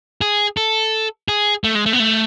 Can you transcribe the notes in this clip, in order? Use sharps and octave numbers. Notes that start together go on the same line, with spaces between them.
G#4
A4
G#4
A3
G#3
A3
B3
A3